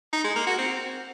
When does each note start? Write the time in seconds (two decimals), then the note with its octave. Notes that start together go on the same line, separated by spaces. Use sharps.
0.13 D#4
0.24 G#3
0.36 A#3
0.47 F#4
0.58 C4